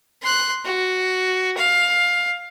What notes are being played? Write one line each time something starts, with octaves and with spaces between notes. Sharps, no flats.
C6 F#6
F#4
F5